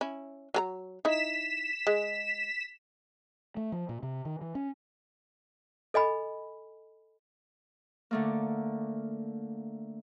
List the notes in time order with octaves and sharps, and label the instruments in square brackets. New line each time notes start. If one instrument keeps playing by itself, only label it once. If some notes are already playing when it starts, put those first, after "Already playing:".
[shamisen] C#4 E4
F#3 A4 A#5
[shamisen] D#4 E4 [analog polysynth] B6 E7
[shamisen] G#3
[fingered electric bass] A3
F3
A#2
C3
D#3
E3
C#4
[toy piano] A4 D#5 G#5 B5
[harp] D3 A3 A#3